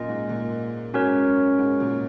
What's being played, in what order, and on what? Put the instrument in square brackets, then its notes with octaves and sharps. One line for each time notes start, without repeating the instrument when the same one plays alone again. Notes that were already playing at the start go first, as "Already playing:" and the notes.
Already playing: [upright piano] F#2 A#2 [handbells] F4 A#4 D#5 G#5
[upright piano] G#2
A#2
[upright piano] G#2 [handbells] C#4 F#4 A#4 C#5
[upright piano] F#2
G#2
A#2